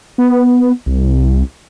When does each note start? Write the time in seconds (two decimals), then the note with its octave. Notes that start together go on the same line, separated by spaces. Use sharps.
0.18 B3
0.86 C2